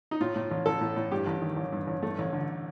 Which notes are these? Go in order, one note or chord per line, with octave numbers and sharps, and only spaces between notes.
D#4
A2 F4
A2
A1
A1 A4
A2
A2
G2 G4
A1
D#3
A1
G2
A1
G2 A3
A1
D3